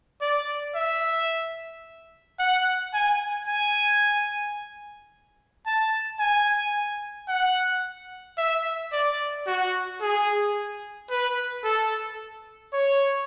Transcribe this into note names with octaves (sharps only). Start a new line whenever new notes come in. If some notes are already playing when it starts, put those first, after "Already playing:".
D5
E5
F#5
G#5
G#5
A5
G#5
F#5
E5
D5
F#4
G#4
B4
A4
C#5